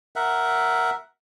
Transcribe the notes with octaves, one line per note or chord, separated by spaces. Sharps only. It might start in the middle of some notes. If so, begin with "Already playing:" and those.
A#4 E5 F#5